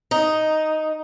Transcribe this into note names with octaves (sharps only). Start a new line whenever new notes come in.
D#4